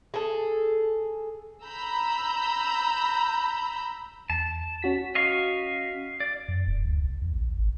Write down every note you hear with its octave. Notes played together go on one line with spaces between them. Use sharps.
G#4 A4
A#5 B5 E6 G6
E2 A5
C#4 F#4 B6
D#5 F5 C#6
D5
F#2
E1
D2
C2
E2
A#1
G#1